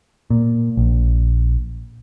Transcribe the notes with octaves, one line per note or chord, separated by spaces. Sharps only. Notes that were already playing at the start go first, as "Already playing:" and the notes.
A#2
A#1